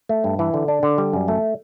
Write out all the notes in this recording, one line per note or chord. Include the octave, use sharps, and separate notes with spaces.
A3
G2
E3
D3
D4
D3
G3
F#2
A3